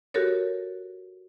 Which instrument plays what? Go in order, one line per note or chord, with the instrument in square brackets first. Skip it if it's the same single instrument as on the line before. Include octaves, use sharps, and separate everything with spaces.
[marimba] F#4 G4 A4 A#4 C#5